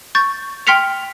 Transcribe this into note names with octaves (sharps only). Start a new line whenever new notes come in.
C#6 G6 A6
G5 C6 F6 B6 C#7 F7